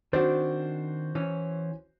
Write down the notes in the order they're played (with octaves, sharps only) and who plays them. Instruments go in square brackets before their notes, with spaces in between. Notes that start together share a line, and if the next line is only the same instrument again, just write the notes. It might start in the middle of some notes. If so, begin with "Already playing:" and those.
[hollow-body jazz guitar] D#3 C4 D4 [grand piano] F#4 C5
[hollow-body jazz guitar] E3 C#4